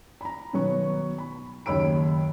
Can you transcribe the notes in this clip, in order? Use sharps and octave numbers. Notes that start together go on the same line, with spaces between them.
A#5 B5
B2 D#3 F#3 B3 C#6
B5
F#1 D#2 C#5 B5 E6 D7